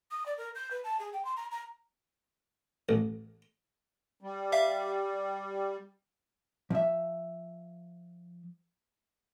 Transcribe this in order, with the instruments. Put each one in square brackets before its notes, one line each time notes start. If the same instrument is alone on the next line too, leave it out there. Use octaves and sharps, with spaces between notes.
[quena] D#6
D5
A#4
G6
B4
A5
G#4
G5
C6
A#5
A#5
[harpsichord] A1
[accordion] G3
[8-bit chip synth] E5 F5
[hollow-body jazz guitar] F3 E5